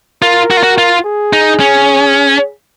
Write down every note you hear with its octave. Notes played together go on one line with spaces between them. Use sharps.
F4 A#4
F#4
F4
F#4
F4
G#4
D#4
C#4